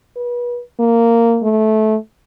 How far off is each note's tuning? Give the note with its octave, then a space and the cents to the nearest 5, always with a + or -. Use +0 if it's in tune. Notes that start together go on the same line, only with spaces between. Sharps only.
B4 -35
A#3 -10
A3 -20